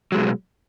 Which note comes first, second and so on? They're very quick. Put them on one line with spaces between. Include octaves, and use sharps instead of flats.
F#3 G#3 B2